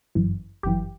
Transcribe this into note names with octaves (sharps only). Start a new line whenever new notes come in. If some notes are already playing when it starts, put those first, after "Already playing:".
G1 F#2 E3
G1 F#2 E3 G4